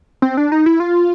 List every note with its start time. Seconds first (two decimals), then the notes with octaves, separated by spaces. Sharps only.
0.22 C4
0.37 D4
0.52 D#4
0.66 E4
0.80 F4